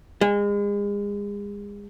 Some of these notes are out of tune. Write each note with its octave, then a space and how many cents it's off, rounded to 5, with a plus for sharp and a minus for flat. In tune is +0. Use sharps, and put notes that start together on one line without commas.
G#3 -35